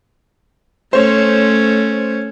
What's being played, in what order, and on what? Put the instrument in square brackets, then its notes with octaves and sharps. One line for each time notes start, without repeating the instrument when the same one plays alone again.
[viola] A3 C#4 [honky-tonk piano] C5 C#5